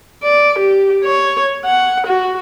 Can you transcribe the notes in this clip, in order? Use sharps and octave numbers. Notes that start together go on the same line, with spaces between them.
D5
G4
C#5
F#5
F#4